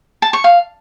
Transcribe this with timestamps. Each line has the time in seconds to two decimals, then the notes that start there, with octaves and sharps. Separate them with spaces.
0.22 A5
0.33 C#6
0.44 F5